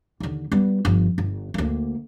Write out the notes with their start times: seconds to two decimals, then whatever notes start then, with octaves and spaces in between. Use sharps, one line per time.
0.20 D#2 D3
0.52 G3 B3
0.85 G1 F3
1.18 G1
1.54 D2 A#3